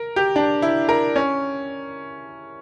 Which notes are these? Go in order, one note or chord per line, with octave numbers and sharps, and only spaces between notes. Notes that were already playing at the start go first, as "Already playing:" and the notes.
Already playing: A#4
G4
D4
E4
A#4
C#4